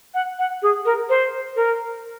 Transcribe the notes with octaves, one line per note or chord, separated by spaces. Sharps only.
F#5
F#5
G#4
A#4
C5
A#4